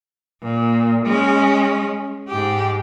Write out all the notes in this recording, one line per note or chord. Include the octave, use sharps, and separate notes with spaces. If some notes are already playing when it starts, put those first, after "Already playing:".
A#2
G#3 C#4
G#2 G4